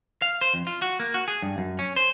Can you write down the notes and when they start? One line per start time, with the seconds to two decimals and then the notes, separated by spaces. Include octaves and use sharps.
0.22 F5
0.41 C5
0.54 F2
0.67 F4
0.82 F#4
1.00 A#3
1.14 F#4
1.28 G#4
1.42 G2
1.58 F#2
1.79 C#4
1.96 C5